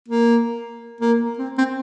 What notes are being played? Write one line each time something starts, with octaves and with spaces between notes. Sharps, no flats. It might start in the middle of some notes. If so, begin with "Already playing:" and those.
A#3
A#3
C4
C4